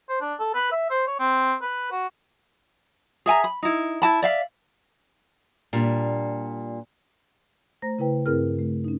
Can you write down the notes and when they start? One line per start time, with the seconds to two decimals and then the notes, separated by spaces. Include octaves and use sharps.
0.09 C5
0.21 D4
0.39 A4
0.54 B4
0.72 E5
0.90 C5
1.07 C#5
1.19 C4
1.62 B4
1.91 F#4
3.26 G#4 E5 G#5 A#5
3.44 B5
3.63 D#4 E4
4.02 E4 A5 B5
4.22 D5 E5 F5
5.73 A#2 G3 D4
7.82 A3 C5 A#5 A#6
7.99 C#3 E4 B4 G5
8.26 G2 C4 E4 G#4 A#4 F6
8.55 C#3 A3
8.84 C#4 D#4